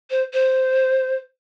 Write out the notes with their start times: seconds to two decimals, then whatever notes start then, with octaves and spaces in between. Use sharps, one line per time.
0.10 C5
0.33 C5